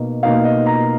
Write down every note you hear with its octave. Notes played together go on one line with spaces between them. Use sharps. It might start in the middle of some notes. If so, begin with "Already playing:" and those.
Already playing: B2 A#3 D#4
B2 A#3 D#4 F5
D#5
A#5